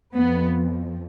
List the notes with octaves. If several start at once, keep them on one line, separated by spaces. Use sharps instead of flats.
F2 F3 B3